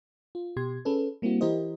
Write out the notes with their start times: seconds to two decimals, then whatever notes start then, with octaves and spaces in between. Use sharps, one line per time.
0.35 F4
0.57 B2 G4 C6 G#6
0.85 C#4 G#4 A4 B4
1.22 G3 A#3 C4 E4 F#4
1.41 E3 E4 G4 A#4 C5 D#5